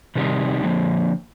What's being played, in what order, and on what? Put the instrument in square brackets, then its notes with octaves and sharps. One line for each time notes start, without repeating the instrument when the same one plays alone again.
[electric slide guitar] C3 D#3 G3 C4 D#4
D3 F3 A#3